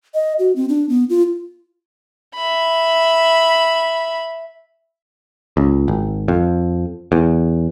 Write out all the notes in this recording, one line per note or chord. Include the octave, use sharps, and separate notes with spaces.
D#5
F#4
C4
D4
B3
F4
E5 B5
C#2
G#1
F2
E2